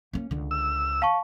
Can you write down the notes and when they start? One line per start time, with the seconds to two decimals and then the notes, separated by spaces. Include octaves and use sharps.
0.13 A#3 C#4
0.31 C#2 D3
0.51 E6
1.02 F5 A5 C#6